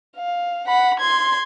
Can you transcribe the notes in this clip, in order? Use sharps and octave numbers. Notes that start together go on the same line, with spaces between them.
F5
F#5 B5
C6 G#6